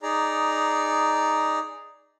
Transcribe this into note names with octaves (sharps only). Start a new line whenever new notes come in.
D#4 G#4 D5 A#5